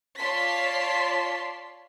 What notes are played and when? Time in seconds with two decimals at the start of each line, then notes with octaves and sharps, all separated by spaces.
0.19 F4 C#5 D5 A5 C6 B6